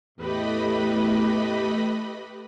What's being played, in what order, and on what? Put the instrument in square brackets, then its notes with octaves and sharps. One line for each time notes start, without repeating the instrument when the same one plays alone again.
[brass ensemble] E2 A2 [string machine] A3 D#5 B5 [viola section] G4 B4